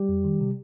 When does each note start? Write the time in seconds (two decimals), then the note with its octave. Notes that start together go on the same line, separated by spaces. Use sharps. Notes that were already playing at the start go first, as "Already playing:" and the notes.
Already playing: G3 G4
0.09 F2
0.24 D#3
0.41 C3